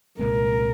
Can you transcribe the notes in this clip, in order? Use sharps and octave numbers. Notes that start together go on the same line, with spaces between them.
C2 A#2 G#3 C4 A#4